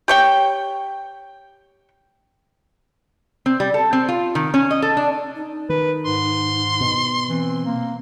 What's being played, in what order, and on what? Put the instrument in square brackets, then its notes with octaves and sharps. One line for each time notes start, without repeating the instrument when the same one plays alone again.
[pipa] G4 C#5 G5
[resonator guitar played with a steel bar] C4
G3
A4
C4
F4
D#3
C#4
D#5
A4
D4
[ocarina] D#4
[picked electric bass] D#3 [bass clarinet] B4
[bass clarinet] G#2 [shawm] C6
[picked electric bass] B2
[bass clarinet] E3 [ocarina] C4
[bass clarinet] A#3